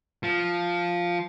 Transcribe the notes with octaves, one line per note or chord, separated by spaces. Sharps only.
F3